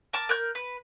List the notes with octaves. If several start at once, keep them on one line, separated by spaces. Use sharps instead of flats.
A#4 A5 D6
A#4 F#6 G6
B4